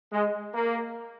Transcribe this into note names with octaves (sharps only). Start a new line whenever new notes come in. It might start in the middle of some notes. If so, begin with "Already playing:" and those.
G#3
A#3